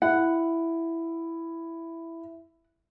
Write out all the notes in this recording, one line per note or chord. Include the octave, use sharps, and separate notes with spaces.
E4 F#5